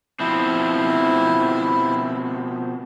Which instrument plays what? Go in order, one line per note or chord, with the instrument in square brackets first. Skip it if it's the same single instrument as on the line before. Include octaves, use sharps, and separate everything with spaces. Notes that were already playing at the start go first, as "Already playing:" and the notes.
[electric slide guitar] B2 F3 C4 [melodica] E4